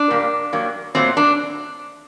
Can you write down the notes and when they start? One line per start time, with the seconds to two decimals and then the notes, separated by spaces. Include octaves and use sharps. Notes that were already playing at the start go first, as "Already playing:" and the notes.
Already playing: D4
0.11 A#2 G3 A#3
0.53 G2 F#3 A#3
0.95 A#2 F#3 A3 C4
1.17 D4